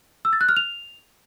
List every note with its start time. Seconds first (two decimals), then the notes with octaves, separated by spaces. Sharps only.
0.25 E6
0.33 A6
0.41 F#6
0.49 F6
0.57 F7